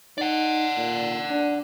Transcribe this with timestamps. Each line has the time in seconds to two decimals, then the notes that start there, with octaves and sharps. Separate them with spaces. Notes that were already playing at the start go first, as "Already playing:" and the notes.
0.18 D#4 D5 F#5
0.77 A#2
1.30 D4